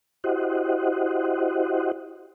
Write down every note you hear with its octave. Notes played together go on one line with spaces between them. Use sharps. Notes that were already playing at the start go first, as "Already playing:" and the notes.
E4 F#4 G4 C5 D#5 F#5